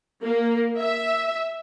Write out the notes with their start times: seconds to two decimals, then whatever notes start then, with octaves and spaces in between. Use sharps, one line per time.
0.23 A#3
0.78 E5